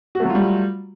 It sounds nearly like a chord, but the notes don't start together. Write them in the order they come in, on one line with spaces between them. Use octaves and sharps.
F#4 A3 F#3 F4 G3